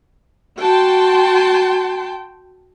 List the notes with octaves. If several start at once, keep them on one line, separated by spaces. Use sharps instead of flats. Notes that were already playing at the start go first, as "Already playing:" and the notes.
F#4 G5 A5 C6